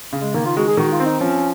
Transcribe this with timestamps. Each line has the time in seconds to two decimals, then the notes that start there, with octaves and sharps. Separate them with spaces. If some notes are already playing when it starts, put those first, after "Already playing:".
0.13 C#3
0.21 G#3
0.34 D#3 A#3
0.46 F4
0.56 G#3 F#4
0.68 G#4
0.77 D#3 F#4
0.92 F4
1.00 C4
1.06 D#4
1.20 F3 C#4